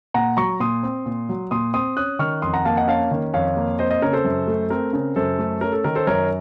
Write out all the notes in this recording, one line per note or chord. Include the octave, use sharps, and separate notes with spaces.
A#2 F#5 A#5
F#3 A#5 C#6
A#2 C6 D#6
C4
A#2
F#3
A#2 C6 D#6
C4 C6 D#6
C#4 D#6 F#6
D#3 C#6 F6
F2 C6 D#6
F#5 A#5
A#3 F5 A5
D#5 F#5
C#4 F5 A5
D#3
F2 C#5 F5
A#3
C4 C5 D#5
C5 D#5
C#3 A#4 C#5
A4 C5
F#2
A3
C4 A#4
C#3 A#4
F#2 A4 C5
A3
C#4 A#4
A4
D#3 A#4
A4 C5
F#2 A#4 C#5